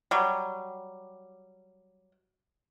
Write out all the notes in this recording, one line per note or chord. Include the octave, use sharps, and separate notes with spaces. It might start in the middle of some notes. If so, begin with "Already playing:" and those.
F#3 G3